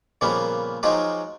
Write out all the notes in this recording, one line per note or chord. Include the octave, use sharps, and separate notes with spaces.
A#2 C#3 F3 G3 A#3 B3
F3 F#3 G#3 D#4 F4 G4